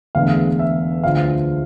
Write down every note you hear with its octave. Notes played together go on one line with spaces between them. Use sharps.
E1 E2 D3 A3 F5
E5
D2 D3 F3 F5